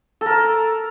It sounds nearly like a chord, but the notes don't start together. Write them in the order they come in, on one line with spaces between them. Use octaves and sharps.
A4 A#4 A5